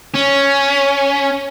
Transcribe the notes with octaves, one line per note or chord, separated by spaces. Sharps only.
C#4